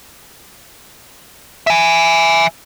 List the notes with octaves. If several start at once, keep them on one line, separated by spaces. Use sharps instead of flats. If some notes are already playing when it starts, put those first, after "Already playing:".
E5 G#5